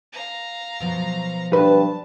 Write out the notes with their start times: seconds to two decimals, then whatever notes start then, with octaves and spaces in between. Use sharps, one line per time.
0.13 F5 A#5
0.80 B2 F3 F#3
1.53 G2 B4 A5